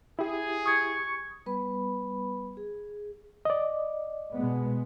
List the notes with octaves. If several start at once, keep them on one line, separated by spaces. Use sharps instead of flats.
E4 G4 G#4
C#6 D#6 G#6
G3 B3 B4 B5
G#4
D5 D#5
B2 G#3 B3